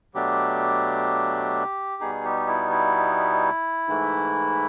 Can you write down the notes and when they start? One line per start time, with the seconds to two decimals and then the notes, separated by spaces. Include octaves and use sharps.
0.15 B2 F#3 A3 D4 G4
2.01 B2 G3 B3 D#4 G#4
2.25 G4
2.47 E4
2.71 E4
3.87 G#2 E3 A3